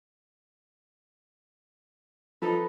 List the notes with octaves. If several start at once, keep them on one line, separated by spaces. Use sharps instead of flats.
F3 D#4 A4 B4